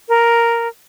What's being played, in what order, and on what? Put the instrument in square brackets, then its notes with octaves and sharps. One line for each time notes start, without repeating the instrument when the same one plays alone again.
[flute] A#4